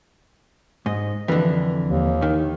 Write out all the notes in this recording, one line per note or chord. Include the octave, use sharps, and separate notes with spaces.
G#2 D#5
F2 D3 E3
D#2
D#3